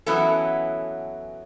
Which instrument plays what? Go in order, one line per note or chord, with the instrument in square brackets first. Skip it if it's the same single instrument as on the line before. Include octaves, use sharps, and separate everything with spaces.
[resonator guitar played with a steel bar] E3 F#3 B3 C#4 E4 A4